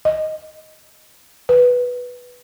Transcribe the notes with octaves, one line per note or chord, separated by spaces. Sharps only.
D#5
B4